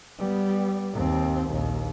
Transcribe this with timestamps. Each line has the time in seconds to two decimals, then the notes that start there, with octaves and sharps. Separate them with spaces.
0.19 G3 B3
0.93 D#2 C4
1.49 A#1 D#2